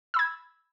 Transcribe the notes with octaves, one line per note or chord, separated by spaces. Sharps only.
B5 E6 G#6